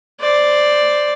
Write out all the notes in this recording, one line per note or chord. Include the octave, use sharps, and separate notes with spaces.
C5 D5